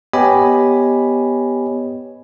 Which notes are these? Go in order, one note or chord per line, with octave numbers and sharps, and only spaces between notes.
B3 G4 C#5 D#5 G#5 B5